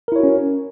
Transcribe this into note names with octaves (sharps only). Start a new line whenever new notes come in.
C#4 E4 F#4 A#4 C#5